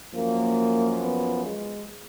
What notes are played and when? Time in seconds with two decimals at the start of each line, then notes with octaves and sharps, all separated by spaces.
0.14 F#2 F3 A#3
1.01 B3
1.45 G#3